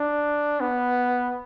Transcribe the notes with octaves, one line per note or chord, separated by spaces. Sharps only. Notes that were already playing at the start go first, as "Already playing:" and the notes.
Already playing: D4
B3